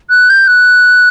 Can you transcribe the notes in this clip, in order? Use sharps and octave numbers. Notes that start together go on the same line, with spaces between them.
F#6
G6
F#6